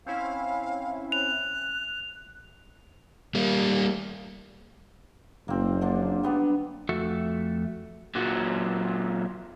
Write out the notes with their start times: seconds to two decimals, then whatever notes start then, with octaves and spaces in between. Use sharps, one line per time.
0.06 C4 C#4 E4 F5
1.12 F#6 F7
3.35 G3 A#3
5.48 F#1 A#3 C4
5.81 D3 F3 D4
6.23 G3 B3 D4
6.89 F2 A3 F#4 A4 E5
8.15 A#2 F#3